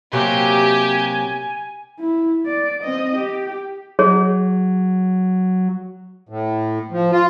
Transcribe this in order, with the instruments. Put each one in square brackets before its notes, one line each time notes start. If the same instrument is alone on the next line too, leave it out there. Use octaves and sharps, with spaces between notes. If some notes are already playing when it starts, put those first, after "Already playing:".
[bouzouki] C3 F#3 A#3 [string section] G4 [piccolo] G#5
[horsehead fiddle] E4
D5
C4 D#5
G4
[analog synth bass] F#3 [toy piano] G#4 C#5
[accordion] A2
F3
F4